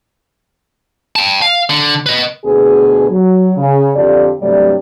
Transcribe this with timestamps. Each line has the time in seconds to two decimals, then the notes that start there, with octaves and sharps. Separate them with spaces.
1.16 G5 A5
1.42 F5
1.70 D3
2.06 B4 D#5
2.45 D2 B2 B3 G#4
3.10 F#3
3.57 C#3
3.96 F2 D3 G4 A4 D5
4.42 G2 C3 F#3 G3 A3 D5